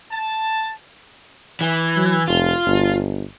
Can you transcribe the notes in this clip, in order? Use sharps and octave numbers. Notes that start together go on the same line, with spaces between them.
A5
E3
F#3
F1 F4
G1